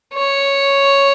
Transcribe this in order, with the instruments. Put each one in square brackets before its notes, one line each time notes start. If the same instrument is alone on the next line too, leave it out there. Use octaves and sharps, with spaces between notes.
[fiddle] C#5